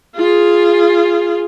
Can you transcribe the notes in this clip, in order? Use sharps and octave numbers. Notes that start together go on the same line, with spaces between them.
F4 G#4